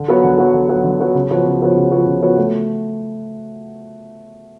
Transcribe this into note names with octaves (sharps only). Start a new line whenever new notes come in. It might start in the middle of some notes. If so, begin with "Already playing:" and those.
Already playing: D3
F#3 B3 F#4 C#5
D3
F#3 B3 F#4 C#5
D3
F#3 B3 F#4 C#5
D3
F#3 B3 F#4 C#5
C#3
F3 B3 F#4 C#5
C#3
F3 B3 F#4 C#5
C#3
F3 B3 F#4 C#5
C#3
F3 B3 F#4 C#5
A3